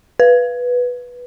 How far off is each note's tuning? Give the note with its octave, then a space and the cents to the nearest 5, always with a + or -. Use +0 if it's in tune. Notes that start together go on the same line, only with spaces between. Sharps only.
B4 -5